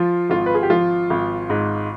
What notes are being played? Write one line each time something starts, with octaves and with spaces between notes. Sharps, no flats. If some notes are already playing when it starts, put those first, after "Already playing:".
Already playing: F3 F4
G#1 F4
B4
G#4
G4
F3 F4
G#1
G#2